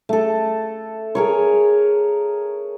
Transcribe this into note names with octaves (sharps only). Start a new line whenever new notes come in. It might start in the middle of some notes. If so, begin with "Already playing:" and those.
A3 A4
G#4 A#4 C#5